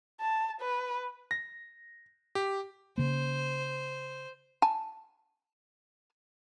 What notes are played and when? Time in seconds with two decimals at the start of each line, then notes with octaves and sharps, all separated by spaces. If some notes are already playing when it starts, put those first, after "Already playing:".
0.21 A5
0.61 B4
1.31 A#6
2.35 G4
2.98 C#3 A#3 C5
4.62 G#5 A5